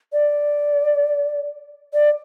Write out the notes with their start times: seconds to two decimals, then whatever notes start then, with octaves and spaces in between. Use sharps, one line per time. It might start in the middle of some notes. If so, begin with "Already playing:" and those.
0.13 D5
1.93 D5